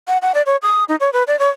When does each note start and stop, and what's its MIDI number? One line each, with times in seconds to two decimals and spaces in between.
0.08 0.18 78
0.22 0.32 78
0.34 0.42 74
0.46 0.56 73
0.62 0.84 87
0.89 0.96 63
1.00 1.10 73
1.13 1.23 71
1.27 1.38 74
1.39 1.49 73